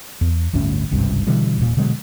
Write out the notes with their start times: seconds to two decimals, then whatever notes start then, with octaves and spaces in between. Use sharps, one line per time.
0.21 E2
0.53 G1 D2 A2 C#4
0.91 G#1 C#2 G2 C3
1.27 B2 D3 E3 G3
1.57 D#1 A#2
1.77 B2 D3 F#3 G#3